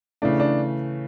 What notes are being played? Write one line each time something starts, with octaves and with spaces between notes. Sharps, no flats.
C#3 E3 A3 D4
D4